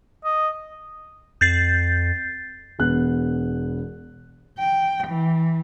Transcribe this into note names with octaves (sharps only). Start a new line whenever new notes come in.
D#5
F2 G6 A6 C7
E1 B3 F#6
G5
E3